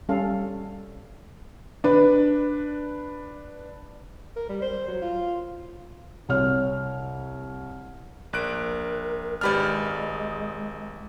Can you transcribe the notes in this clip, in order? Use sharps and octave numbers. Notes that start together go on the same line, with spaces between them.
G3 C#4 A4 F5
D4 B4
A#4
G3
C5
F#3
F4
C2 C#5 F6
A#1 A#4 F#6 D7
G#1 G#3 D4 G4 B4 D5 F6